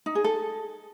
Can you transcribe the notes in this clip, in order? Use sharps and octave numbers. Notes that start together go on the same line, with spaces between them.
D#4
G#4
A4